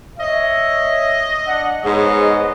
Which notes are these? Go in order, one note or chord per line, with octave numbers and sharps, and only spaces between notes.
C#5 D#5 E5
D4 F#5
G#2 B3 C#5 D#5